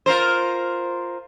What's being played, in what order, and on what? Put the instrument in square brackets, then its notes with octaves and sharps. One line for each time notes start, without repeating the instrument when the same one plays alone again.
[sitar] F4 A#4 C5